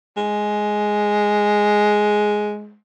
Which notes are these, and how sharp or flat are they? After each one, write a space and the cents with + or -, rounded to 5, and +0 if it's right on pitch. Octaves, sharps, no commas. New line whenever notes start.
G#3 +5